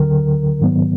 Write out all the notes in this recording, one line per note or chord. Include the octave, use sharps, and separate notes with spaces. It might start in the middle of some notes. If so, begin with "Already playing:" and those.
Already playing: D2 D3 F#3 A#4
G#2 D#3 F#3 B3